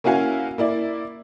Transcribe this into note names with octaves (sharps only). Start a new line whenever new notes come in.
A#3 C#4 E4 F#4 F5 G#5
A#3 E4 D5